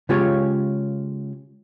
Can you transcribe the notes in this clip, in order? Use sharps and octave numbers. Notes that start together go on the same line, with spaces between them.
C#3 G#3 F4 G4 C#5